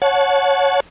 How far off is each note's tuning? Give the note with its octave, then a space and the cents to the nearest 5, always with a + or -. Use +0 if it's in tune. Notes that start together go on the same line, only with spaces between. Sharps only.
C#5 +0 F#5 -15 A5 -25